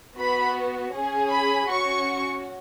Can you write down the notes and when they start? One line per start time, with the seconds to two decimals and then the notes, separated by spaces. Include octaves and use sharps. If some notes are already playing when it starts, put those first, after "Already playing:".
0.17 B3 F#4 B5
0.93 C#4 G#4
1.30 B5
1.68 C#4 F#4 C#6